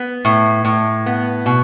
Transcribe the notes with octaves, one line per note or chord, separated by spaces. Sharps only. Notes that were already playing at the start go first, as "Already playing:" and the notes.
Already playing: B3
A2
A2
B3
B2